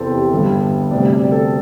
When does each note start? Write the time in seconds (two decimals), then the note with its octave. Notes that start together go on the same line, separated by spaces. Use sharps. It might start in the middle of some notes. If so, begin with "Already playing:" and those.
Already playing: E2 C3 E3 C4 A4 C5
0.11 G4
0.31 G1 G2 G3 A4
0.91 D2 C3 G3 D5
1.12 D5
1.32 A4